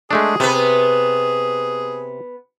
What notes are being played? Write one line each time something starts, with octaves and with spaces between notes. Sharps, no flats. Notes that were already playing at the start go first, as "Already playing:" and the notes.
G#3 A3 D4 G#4
C3 B3 B4